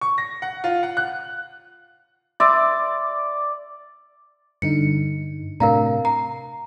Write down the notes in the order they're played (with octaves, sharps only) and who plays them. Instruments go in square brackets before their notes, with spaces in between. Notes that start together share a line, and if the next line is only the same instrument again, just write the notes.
[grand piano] C#6
A#6
F#5
F4
F#5
F#6
[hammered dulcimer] D5 [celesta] E5 C6 E6
[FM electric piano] G2 D3 D#4 [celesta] C#7
[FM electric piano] A2 C3 D4 [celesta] A#4 F5 A#5
[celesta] A#5 [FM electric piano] C7